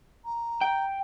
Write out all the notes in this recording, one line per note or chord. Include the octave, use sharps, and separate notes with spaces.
A#5
G5